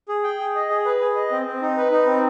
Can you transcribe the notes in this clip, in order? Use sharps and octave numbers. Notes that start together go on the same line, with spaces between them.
G#4
G5
G#4
D#5
G#4
B4
G#4
D#5
C4
C4
D#4
B4
D#4
C4